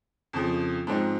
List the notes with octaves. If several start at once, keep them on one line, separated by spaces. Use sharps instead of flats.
F2 C#3 F3
G#2 F3 G#3 C4 D#4